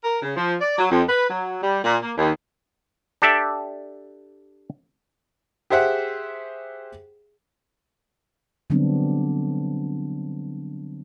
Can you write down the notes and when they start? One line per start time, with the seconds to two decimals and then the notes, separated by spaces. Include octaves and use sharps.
0.04 A#4
0.22 C#3
0.36 F3
0.60 D5
0.78 F#3
0.91 F2
1.08 B4
1.29 F#3
1.62 G3
1.83 A#2
2.02 A#3
2.17 D#2
3.22 D4 G4 A4 D5 E5
5.70 G4 G#4 C5 E5 F#5
8.70 D3 F#3 G3 B3 C4 D4